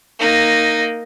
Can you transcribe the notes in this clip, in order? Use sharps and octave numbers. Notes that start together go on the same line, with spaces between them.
A#3 D#4